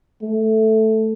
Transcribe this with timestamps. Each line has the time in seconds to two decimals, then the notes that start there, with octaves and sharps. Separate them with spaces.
0.22 A3